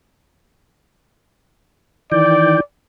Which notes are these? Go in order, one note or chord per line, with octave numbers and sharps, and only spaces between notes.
D#3 E3 D5 G5